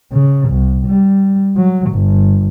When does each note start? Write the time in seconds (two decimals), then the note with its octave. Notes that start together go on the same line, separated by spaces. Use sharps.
0.13 C#3
0.49 C2
0.86 G3
1.56 F#3
1.91 G1